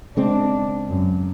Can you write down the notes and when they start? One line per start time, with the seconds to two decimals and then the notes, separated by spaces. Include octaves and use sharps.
0.17 C#3 G#3 C4 D4
0.88 F#2